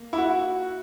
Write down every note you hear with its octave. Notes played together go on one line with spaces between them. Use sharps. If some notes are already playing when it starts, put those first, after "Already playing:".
Already playing: A#3
E4
F#4